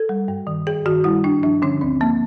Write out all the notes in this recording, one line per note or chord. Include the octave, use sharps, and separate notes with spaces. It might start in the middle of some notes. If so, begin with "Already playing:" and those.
Already playing: A4
G3
G2
D#3
G2 G#4
D#3 F#4
G3 E4
G2 D4
F3 D4
D3 C#4
D2 C4
F3 A#3